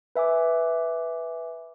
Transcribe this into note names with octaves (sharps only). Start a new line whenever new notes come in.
B4 E5 G#5 D6